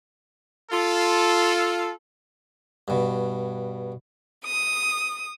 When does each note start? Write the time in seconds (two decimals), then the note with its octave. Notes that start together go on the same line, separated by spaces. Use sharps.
0.71 F4 A4
2.88 G2 B2
4.45 D#6